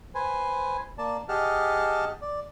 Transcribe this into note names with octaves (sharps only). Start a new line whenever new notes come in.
B4 C5 G#5
A#3 D5 A5
G4 G#4 D#5 F#5 A5 F6
D5